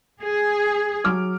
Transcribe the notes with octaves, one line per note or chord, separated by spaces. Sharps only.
G#4
F#3 D6 F6